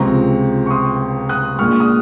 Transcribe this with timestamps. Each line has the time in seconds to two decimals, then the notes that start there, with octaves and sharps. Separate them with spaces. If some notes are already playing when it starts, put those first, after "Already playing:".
Already playing: C#2 C3 F3 G#3 C4 A#5 C#6
0.66 C#6
0.71 C6 D#6
1.29 D#6 F#6
1.59 A#1 A#2 G#3 C#6 F6
1.80 D#6